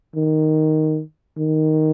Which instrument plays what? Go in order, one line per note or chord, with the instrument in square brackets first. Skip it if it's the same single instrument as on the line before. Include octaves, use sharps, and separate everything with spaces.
[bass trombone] D#3
D#3